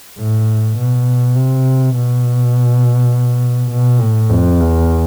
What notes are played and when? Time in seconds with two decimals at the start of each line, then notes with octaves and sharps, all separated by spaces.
0.18 A2
0.77 B2
1.36 C3
1.95 B2
3.71 B2
4.00 A2
4.30 F2
4.60 E2